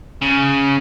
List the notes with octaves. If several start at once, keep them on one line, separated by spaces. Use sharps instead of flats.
C#3